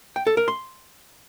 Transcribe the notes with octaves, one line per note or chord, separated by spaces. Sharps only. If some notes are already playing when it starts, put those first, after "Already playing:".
G5
A4
A#4
C6